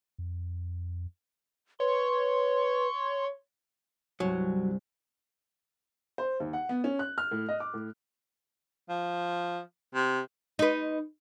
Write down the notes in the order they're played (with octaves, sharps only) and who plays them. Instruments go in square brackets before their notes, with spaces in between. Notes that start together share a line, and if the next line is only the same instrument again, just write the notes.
[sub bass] F2
[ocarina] B4 [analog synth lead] C#5 [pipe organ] C6
[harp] C2 G2 [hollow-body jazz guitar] F#3
[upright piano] C5
D#2
F#5
B3
C#4
F#6
F6
A2
D#5
D6
A2
[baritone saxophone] F3
C3
[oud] D#4 B4